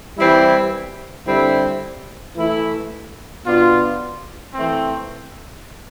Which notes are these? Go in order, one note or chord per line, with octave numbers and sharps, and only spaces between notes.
E3 G3 C4 E4
D3 G3 C4 E4
E3 A3 E4
B2 B3 D4 F4
E3 A3 C4